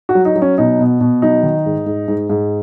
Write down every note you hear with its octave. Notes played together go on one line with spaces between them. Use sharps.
F#4
F#3
D#4
F#3
C#4
B2 D#4
B2
B2
F#3 D#4
D#3
G#2
G#2
G#2
G#2